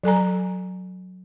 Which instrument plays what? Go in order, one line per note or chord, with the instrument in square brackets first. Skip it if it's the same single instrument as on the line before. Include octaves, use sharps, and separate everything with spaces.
[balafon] F#3 A4 G#5 A#5